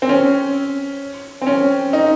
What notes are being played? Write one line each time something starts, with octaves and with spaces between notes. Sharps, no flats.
C4
C#4
C4
C#4
D#4